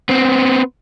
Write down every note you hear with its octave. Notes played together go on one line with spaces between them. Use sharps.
B3 C4